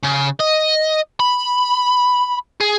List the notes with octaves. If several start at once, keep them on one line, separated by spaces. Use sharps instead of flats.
C#3
D#5
B5
G#4